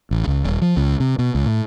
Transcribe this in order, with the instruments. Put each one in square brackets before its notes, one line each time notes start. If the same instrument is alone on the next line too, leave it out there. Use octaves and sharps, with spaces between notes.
[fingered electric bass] A1
C#2
D#1
F3
C#2
C3
B2
C#2
A2